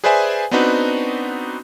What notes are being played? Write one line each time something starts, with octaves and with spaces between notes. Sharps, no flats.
G#4 B4 C5 D5 E5 G#5
B3 C4 D4 D#4 F#4 B4